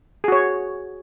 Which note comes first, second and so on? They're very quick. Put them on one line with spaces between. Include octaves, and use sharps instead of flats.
G#4 F#4 C#5